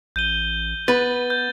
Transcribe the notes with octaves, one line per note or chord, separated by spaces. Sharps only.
A1 G6 D#7 G7
B3 B4 A6
G6